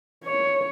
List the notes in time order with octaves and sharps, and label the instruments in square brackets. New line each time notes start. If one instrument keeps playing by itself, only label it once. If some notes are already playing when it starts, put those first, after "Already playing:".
[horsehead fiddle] C#5